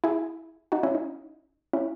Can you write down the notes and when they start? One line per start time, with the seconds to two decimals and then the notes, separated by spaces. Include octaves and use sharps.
0.04 E4 G#4
0.72 D#4 F#4
0.83 C#4 E4
0.95 D#4
1.73 C#4 E4